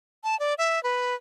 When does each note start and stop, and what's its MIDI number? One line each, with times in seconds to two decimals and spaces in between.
0.24 0.38 81
0.40 0.54 74
0.58 0.82 76
0.83 1.15 71